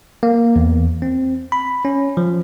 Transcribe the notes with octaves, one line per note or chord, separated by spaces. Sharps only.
A#3
E2
C4
B5
C#4
F3